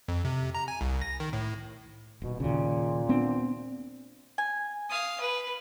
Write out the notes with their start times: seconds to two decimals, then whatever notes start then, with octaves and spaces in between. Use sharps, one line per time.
0.08 F2
0.25 C3
0.55 A#5
0.68 G#5
0.81 C2
1.01 A#6
1.20 D#3
1.33 A2
2.22 D#1 B2
2.40 D#2 A#2 C#3
3.09 B3 C4 D4
4.38 G#5
4.90 F5 D#6
5.20 B4